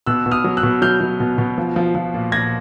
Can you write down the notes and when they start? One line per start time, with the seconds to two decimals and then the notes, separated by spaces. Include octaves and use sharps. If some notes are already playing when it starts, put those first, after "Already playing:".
0.06 B2 E6 F#6
0.26 B2
0.31 D#6 F6
0.44 F#3
0.57 E6 F#6
0.63 B2
0.82 F#3 F6 G6
1.01 F#3
1.20 B2
1.38 B2
1.58 F3
1.76 F3
1.95 F3
2.14 A#2
2.32 A#2 G#6 A#6